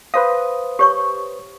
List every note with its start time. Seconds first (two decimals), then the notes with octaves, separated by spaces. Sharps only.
0.14 B4 C5 F5 D#6
0.79 G4 C#5 C#6